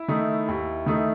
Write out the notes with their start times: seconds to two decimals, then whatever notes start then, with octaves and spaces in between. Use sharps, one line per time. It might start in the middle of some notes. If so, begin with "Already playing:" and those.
Already playing: E4
0.08 D#3 A3 D#4
0.48 D#2
0.86 D#3 A3 D#4